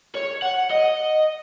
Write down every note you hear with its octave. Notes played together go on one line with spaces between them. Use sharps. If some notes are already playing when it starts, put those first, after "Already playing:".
C#5
F#5
D#5